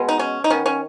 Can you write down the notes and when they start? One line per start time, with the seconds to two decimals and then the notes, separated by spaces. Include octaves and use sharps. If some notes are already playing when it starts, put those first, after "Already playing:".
Already playing: B2 G#3 B3
0.09 D#4
0.19 C#4
0.44 D#4
0.50 D#3 B3 C#4
0.66 C#4